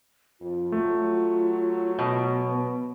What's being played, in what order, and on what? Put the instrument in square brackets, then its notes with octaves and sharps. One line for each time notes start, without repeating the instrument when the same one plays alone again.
[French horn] F2 [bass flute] F4
[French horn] F#3 [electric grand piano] A3
[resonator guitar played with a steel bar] B2 [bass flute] B3
[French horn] B4